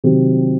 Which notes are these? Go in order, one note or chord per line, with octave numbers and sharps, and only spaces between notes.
C3 D#3 F#3 C4 G4